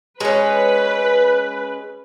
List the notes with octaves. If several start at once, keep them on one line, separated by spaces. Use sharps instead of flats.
G#3 C#4 B4